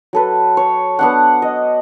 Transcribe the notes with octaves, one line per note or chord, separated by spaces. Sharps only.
F#3 A4 B4
C#5
B3 D4 F#5
D#5